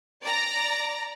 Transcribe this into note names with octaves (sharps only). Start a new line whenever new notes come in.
D5 A#5